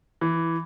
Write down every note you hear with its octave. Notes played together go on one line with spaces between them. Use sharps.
E3